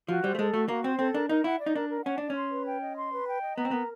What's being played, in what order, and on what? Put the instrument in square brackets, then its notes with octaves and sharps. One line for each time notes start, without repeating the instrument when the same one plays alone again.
[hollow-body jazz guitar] F3 [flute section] F#4
[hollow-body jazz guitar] G3 [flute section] C5
[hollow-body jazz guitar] A3
[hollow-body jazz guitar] G#3 [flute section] A4
[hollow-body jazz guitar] A3 [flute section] F#4
[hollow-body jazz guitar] A#3 [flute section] F#4
[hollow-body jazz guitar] C4 [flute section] C5
[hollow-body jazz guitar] C4 [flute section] A4
[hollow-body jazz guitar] D4 [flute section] A#4
[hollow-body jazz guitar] D#4 [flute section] A#4
[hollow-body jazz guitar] E4 [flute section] F#5
[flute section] D5
[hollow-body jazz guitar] D#4
[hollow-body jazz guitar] D4 [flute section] A#4
[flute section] A#4
[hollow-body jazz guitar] C#4 [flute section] F#5
[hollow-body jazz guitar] D4 [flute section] D5
[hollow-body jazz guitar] C#4
[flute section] C6
B4
G5
D#5
C6
B4
G5
D#5
[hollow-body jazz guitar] B3 [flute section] A#5
[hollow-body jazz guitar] C4
[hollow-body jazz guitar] B3 [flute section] A#4